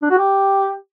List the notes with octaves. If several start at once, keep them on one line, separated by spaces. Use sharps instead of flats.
D4
F#4
G4